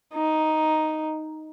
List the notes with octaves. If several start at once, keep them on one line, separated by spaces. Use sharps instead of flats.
D#4